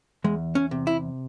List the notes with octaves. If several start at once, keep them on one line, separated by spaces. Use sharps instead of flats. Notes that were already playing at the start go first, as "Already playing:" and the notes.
E2 G#3
C#4
C3
E4